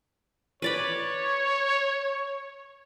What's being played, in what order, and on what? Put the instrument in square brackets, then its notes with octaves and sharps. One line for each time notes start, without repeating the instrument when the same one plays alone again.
[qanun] B4 D5 B5 [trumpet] C#5